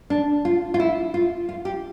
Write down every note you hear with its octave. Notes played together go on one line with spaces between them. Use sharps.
D4
F4
F4
E4
F4
F4
G4